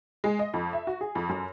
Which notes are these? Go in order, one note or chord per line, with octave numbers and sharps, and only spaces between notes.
G#3
D#5
F2
E5
F#4
G#4
F2
F#2